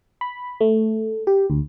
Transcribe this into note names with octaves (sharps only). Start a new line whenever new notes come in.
B5
A3
G4
D2